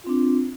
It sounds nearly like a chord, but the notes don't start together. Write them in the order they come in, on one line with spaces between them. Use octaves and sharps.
F4 C4 D4